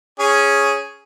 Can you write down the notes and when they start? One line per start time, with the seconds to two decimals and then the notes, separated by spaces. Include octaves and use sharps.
0.19 C#4 G#4